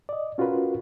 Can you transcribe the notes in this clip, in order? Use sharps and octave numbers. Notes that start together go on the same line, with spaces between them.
D5 D#5
C#4 F4 F#4 A#4 B4